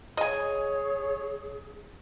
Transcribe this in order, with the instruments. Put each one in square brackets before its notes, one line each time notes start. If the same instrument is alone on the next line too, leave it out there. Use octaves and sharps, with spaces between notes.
[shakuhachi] G#4 [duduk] C#5 [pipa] D#5 G#5